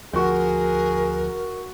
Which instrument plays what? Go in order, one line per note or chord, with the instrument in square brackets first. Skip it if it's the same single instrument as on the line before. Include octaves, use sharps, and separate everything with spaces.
[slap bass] D2 F3 [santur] F#4 G5 [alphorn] G#4 [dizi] A#4